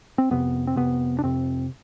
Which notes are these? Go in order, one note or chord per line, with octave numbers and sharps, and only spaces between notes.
C4
F2 C3 B3
C4
F2 C3 B3
D4
F2 C3 C4